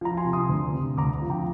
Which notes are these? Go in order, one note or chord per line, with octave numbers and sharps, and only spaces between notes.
F3 A#5
G#5 C6
C3
C6 D#6
D2
C3
D2 A#5 D6
F3
G5 A#5